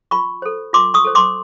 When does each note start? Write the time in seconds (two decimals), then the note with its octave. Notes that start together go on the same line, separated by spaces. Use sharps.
0.11 F4 B5 C#6
0.42 A4 C5
0.73 F4 C6 D6
0.94 C#6 D#6
1.05 A4 C5
1.15 C6 D6